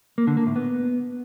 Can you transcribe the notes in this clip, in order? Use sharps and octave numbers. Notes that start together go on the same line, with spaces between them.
A#3
D3
A#3
A2
B3